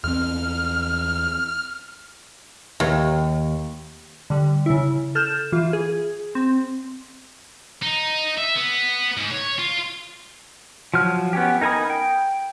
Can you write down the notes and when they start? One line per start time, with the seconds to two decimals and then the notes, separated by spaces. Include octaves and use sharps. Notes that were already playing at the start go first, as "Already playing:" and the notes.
0.04 E2 C4 F6
2.80 D#2
4.30 D3 G3
4.66 C#3 E4
5.15 A4 F6 G6 E7
5.52 E3 F4
5.73 G#4
6.35 C4
7.82 D#4
8.38 E5
8.56 B3
9.17 G#2
9.31 C#5
9.59 F4
10.94 F3 F#3 F6
11.33 B3 C#4 G4
11.61 D#4 A#4 G#5 B5 D#6
11.90 G5